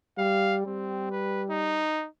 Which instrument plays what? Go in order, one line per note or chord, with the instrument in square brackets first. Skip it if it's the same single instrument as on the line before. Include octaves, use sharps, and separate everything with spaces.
[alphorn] G3 [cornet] F5
[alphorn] G3 [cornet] C4
[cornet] B4
D#4